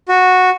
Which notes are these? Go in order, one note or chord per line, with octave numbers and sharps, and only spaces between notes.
F#4